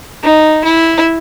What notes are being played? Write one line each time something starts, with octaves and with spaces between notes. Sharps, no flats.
D#4
E4